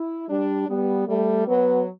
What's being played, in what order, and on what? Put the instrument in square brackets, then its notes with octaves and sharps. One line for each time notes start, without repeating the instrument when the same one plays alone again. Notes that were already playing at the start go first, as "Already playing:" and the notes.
Already playing: [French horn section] E4
[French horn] G3 [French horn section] D4
[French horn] G3 [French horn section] B3
[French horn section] G3 [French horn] A3
[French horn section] F#3 [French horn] B3